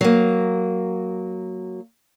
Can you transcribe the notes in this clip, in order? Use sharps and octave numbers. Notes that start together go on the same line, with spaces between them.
F#3 A#3